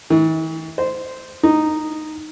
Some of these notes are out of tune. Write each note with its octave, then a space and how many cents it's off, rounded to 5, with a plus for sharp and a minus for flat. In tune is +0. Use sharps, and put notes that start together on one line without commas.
E3 -40
C5 -15
D#4 -10